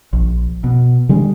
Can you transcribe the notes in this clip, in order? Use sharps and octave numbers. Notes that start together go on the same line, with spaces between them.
A#1
B2
D3 G3 G#3